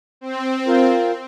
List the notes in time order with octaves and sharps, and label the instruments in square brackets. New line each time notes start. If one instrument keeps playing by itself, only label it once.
[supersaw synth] C4
[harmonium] F4 A#4